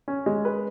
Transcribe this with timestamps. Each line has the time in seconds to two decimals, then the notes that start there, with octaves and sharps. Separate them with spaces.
0.08 C#4
0.26 G#3
0.45 B4